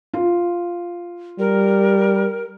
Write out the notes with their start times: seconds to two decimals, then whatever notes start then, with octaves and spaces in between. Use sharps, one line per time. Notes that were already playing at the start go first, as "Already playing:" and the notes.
0.14 F4
1.39 G3 A#4